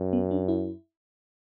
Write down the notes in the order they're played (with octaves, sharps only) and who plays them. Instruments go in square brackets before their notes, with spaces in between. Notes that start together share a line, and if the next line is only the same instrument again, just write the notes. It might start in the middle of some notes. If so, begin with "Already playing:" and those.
Already playing: [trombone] F#2
[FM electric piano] B3
D4
E4